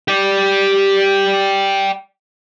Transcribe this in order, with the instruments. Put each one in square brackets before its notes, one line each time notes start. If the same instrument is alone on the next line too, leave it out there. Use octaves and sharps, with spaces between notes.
[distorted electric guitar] G4 D5